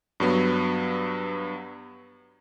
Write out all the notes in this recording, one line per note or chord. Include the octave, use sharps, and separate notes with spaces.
G2 F#3 B3